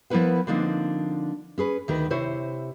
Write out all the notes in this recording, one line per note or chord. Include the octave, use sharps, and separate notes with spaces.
F3 B3 E4 A#4 B4 F#5
D3 F3 A#3 C4 D4 D#4
C#4 G#4 B4
D2 D#3 A#4 B4
C3 E4 C5 C#5